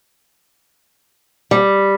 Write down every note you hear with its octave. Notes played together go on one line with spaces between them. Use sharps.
G3